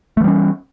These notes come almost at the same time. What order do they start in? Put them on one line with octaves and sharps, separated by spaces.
A3 E3 G3 C#4